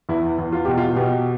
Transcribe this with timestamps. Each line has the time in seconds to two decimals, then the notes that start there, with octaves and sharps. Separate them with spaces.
0.09 E2 E4
0.38 E2
0.52 F4
0.65 B2 G4
0.78 F4
0.96 B2 G4